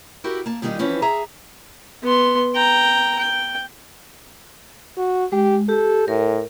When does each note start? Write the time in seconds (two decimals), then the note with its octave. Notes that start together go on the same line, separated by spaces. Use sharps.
0.24 E4 F#4 G4 A#4
0.46 A#3 A5
0.62 A#2 D#3 G3 C#4 D#4 F4
0.79 E3 F3 C4 C#4 B4
1.02 G#4 E5 A#5
2.03 B3 C6
2.55 G5 A#5
3.19 G5
4.97 F#4
5.32 G#3 G4
5.69 G4 A4
6.08 A2 A#4